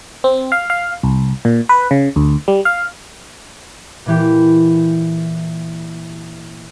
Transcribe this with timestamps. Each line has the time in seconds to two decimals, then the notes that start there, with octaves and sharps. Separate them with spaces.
0.24 C4
0.52 F5
0.70 F5
1.03 C2
1.45 A#2
1.69 B4
1.91 C#3
2.16 D2
2.48 G3
2.65 F5
4.06 A#2 E3 G4